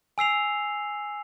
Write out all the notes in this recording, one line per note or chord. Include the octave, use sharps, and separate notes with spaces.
G#5 E6 C7 F7